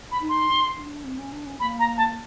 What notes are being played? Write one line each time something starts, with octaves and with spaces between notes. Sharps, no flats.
B5
D#4
C6
D#4
D4
C4
C#4
D4
C#4
A#3 B5
A#5
A5